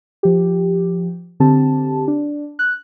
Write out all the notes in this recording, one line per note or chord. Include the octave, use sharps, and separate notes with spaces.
F3 G4
D3 C4 G4 A5
D4
F#6